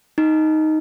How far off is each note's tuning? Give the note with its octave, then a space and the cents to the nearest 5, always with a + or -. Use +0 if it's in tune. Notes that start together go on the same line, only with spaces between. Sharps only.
D#4 +5